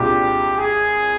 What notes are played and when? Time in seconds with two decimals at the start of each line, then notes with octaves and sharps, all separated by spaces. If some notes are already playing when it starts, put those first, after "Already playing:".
Already playing: C2 A#2 G#3 D4 F4 G4
0.57 G#4